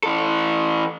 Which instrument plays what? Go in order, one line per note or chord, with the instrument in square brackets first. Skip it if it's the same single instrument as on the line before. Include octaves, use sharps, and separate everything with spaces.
[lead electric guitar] E3 A4